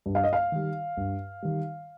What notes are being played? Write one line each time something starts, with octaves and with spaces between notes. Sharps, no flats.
G2
F5
D#5
F5
D#3 G3
G2
D#3 G3